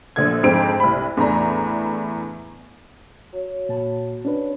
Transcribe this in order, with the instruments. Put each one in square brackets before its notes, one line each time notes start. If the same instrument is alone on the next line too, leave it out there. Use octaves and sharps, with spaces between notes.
[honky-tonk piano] A#1 D3 G#6
F2 G#2 C4 C5 D7
C2 B5
E2 A2 D4 A#5
[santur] F#3
[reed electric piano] A#2 [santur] F#5 A5 B5
[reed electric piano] C#4 D4 B4